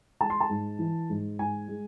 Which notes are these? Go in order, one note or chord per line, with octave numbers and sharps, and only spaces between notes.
G#3 A5
C6
A5
G#2
E3
G#2
G#2 G#5
G#3